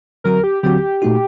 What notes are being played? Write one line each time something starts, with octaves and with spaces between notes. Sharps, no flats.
D3 F#3 C4 F#4 A#4
G4
D3 F#3 C4 F#4 G4
A#2 A3 D#4 F#4